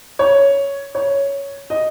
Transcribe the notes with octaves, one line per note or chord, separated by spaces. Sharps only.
C#5
C#5
D#5